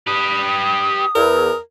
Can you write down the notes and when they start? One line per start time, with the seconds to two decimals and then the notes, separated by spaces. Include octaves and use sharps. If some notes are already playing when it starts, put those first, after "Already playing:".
0.07 G4 B4 D#6
1.15 E2 A#4